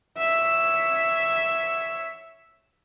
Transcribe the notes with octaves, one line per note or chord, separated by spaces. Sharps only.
C#5 E5